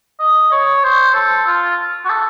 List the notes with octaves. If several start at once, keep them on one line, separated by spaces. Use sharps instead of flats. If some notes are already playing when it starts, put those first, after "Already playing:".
D#5
C#5
C5
A4
F4
F#4
A4